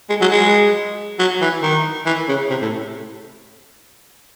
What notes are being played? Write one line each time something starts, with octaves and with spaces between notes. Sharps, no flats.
G#3
F#3
G#3
F#3
E3
D#3
E3
C#3
C3
A2